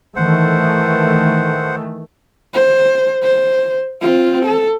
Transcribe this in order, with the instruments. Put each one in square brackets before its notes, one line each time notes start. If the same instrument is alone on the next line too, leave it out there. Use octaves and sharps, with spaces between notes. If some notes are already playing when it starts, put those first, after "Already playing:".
[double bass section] D#3 E3 A3 [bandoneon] C5 F#5
[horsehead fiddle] C5
C5
C4 F4
A4